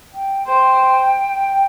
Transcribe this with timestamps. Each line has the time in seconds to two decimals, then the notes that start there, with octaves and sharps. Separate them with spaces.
0.13 G5
0.47 C5 G5